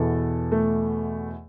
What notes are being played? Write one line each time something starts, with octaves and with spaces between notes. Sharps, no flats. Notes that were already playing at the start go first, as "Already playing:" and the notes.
Already playing: E2 B2 A4
A3